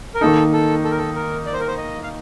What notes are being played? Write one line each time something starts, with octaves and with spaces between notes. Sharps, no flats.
A#4
D#3 A#3 D#4 A4
A4
A4
A#4
A4
A#4
D5
C5
A#4
C5
D#5
F5